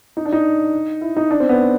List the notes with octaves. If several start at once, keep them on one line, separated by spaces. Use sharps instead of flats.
D#4
D4
D#4
E4
D#4
D4
C4
B3